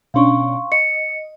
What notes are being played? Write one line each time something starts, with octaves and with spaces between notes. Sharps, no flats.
B2 C#4 D4 F5 C6 C#6
D#5 C#7